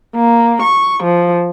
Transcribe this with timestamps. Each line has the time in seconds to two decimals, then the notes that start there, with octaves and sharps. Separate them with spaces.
0.15 A#3
0.62 C#6
1.03 F3